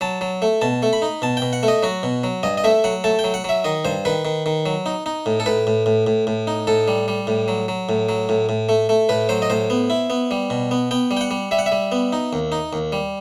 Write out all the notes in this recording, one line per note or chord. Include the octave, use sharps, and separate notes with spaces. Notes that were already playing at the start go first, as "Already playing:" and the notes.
F#3 A5
F#3
A3
B2 A5
A3
B5
D#4
B2 A5
G5
B2
F#5
A3
D#5
F#3 F#4
B2
F#3
G2 D#5
D#5
A3 E5
F#3 F#5
A3 A5
G5
F#3
F#5
F#3 E5
D#3 D#5
G2 C5
D#3 B4
D#3
D#3
F#3
D#4
D#4
A2
A4
A2 B4
A2
A2
A2
A2
D#4
A2 A4
G3
G3
A2
F#3
F#3
A2
F#3
A2
A2
A3
A3
A2 B4
F#3 C5
D#5
A2 C5
B3
E4
B3
G3
B2
B3
B3 G5
G3
G5
F#5
G3
G3 E5
F#5
E5
G3
B3
D#4
D#2
D#4
D#2
G3